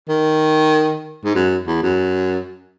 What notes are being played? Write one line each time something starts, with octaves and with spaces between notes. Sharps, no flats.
D#3
G#2
F#2
E2
F#2